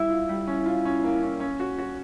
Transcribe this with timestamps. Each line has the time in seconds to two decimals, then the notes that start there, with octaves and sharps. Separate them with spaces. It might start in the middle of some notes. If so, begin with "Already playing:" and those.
Already playing: G3 E4
0.10 F4
0.29 G3
0.47 C#4
0.66 F4
0.85 C#4
1.04 A#3
1.23 C#4
1.40 C#4
1.60 F#4
1.78 F#4